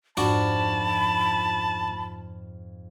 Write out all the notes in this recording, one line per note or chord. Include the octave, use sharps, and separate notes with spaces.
F2 G#2 D4 F#4 A5 B5